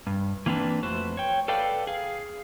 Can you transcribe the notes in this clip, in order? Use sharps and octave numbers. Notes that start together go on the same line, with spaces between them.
G2
E3 A#3 C4 D4 B4
F2 A3 F#4 B4 C5
C#5 G5
A4 B4 D5 F5 G5
G#4 F5